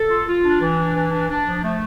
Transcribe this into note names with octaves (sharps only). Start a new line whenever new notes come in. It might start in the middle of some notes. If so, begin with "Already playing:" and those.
Already playing: A4
F4
F4
D4
E3
D4
E3
D4
D4
F3
A3